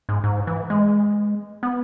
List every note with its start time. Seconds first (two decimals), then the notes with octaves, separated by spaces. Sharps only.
0.09 G#2
0.24 G#2
0.47 E3
0.70 G#3
1.63 B3